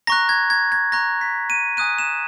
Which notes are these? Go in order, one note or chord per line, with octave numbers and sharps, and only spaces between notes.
A#5 C#6 F#6 A#6
G#6
G#6
G#6
A#5 C#6 F#6 A#6
B6
D#7
G#5 D#6 F#6 D#7
E7